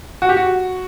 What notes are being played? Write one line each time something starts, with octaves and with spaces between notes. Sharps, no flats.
F#4
G4
F#4